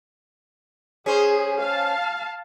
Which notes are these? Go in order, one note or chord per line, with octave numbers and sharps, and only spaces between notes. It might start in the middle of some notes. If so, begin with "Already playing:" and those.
C#4 G#4 C5
F5 A5